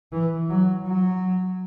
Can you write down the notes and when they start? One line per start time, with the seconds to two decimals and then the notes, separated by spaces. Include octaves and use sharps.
0.12 E3
0.50 F#3
0.87 F#3